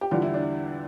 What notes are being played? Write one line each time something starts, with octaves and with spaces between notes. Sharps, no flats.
G4
E2 D3 G3 F4
E4
D4